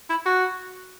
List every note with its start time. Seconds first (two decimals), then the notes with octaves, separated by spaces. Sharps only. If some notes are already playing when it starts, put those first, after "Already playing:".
0.10 E4
0.26 F#4